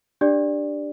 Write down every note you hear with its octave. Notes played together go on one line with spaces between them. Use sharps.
D4 G4 D5